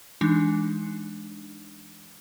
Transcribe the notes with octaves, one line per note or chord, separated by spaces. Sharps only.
E3 G#3 D4 D#4